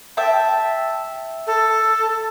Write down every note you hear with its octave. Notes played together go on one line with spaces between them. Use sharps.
E5 G5 A5
A4